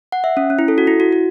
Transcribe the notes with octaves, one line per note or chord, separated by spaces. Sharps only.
F#5
E5
C#4
C#4
E4
A4
F#4
E4
F#4
F#4